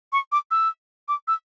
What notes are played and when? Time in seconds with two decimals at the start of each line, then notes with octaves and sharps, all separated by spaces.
0.13 C#6
0.32 D6
0.51 E6
1.08 D6
1.28 E6